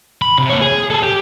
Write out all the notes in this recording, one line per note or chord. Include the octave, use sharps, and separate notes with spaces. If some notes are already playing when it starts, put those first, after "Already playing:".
B5
C3
A#3 C#5
G#4
G#4 A4
G4